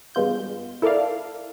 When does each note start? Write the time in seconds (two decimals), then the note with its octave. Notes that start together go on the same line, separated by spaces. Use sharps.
0.15 G2 G#3 B3 F4 G6
0.82 E4 A4 A#4 D5 F5